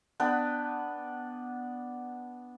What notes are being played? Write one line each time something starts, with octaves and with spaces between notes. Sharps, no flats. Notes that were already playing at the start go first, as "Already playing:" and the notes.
B3 D4 B4 G5